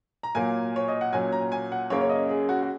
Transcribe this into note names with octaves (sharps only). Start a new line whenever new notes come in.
A#5
A#2 F#3 A#3 G#5
C#5
D#5
F#5
A#2 F#3 C#4 G#5
A#5
G#5
F#5
F#2 C#3 A#3 C#4 C#5
C#5
D#5
G#4
F#4
F#4